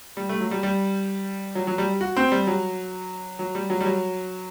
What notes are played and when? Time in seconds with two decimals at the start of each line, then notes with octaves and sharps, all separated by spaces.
0.17 G3
0.29 A3
0.40 F#3
0.51 G3
0.63 G3
1.55 F#3
1.67 F#3
1.78 G3
2.01 F#4
2.16 C4
2.32 G3
2.47 F#3
3.39 F#3
3.55 G3
3.70 F#3
3.80 G3
3.85 F#3